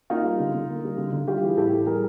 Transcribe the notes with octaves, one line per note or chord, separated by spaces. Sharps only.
A#3 D#4 F4
G3
D3
D3
A#3
G3
D3
D3
G3 F4 G4
E3
G#4
A2 G4 A4
A2
G3 G#4 A#4